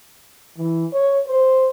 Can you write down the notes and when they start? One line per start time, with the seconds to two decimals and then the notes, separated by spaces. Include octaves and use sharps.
0.58 E3
0.93 C#5
1.28 C5